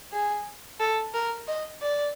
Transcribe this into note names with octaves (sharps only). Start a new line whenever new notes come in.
G#4
A4
A#4
D#5
D5